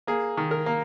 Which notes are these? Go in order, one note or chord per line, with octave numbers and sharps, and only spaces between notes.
A#3 G#4
D#3
A#4
A#3